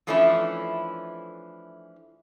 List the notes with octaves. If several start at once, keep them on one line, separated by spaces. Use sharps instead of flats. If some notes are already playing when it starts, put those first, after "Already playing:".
E3 F3 A3 C#4 D4 E4